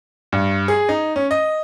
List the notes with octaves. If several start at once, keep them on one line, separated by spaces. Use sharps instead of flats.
G2
G#4
D#4
C#4
D#5